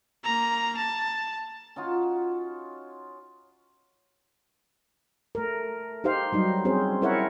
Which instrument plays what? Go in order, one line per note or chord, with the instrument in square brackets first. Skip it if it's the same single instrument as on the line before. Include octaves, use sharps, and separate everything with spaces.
[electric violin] A#3 A#5
A5
[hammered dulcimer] C#4 D#4 F4 F#4
[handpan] A3 A#4
D#4 G4 C5 F5
F#3 G3 D#4
C4 C#4 G#4 C5
C#4 E4 A#4 C#5 E5 F#5